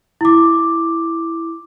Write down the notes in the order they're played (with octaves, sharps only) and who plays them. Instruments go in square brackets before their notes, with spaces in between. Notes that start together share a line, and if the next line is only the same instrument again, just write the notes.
[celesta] E4 D6